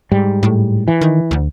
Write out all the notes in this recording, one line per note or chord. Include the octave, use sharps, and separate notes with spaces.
G#2 G3
A2
E3
D#3
D2